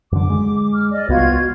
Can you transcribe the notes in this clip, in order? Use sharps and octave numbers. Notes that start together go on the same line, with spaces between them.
F#2 D3 D6
G#3
F6
D5 D#5
C2 B3 F4 F#4 G#6